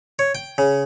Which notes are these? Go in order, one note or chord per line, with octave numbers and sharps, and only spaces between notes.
C#5
G5
C#3